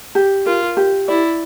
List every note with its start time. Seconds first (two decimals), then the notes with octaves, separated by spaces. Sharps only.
0.15 G4
0.46 F4 A#4
0.77 G4
1.08 E4 D5